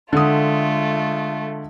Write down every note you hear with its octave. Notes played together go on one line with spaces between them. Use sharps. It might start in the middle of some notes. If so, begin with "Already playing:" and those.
D3 G#3 A3 F4 D#6